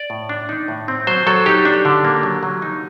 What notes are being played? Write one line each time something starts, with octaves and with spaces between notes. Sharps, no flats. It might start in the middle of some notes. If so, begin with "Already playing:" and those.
Already playing: D5
A2
D4
D#4
A2
C4
F#3 C5
F#3 A4
D#4 G4
D4
D3
A#3
F#3
F#3
D#4